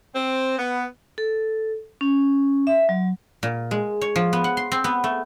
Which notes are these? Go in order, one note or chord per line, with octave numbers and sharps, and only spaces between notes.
C4
B3
A4
C#4
E5
F#3
A#2
G#3
C#5
F3
B3
F#5
C6
C4
B3
A3